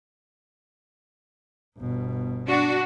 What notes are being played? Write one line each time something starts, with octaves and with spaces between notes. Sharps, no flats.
G1 B2
D4 F#4